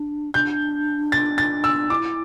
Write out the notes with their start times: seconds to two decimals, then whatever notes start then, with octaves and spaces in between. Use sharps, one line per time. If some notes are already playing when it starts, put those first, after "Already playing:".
Already playing: D4
0.34 D4 G6
1.12 A6
1.38 A6
1.64 E6
1.90 E4 D6